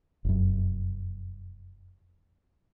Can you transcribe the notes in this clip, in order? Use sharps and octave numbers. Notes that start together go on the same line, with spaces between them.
F1 F#2